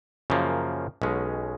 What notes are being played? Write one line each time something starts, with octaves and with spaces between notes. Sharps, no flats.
F#2 C#3 F3 A#3
B1 B2 G#3 C#4